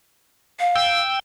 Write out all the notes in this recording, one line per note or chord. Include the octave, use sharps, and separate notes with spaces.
F5
G5 E6